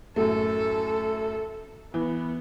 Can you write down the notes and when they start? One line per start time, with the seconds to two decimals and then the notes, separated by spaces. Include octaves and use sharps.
0.16 F#2 A2 A3 A4
1.94 E3 B3